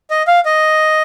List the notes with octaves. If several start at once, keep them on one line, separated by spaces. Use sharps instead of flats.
D#5
F5
D#5